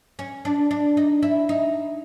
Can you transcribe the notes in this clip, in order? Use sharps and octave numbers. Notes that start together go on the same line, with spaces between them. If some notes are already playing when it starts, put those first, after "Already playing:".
C#4
D4
D4
D#4
E4
D#4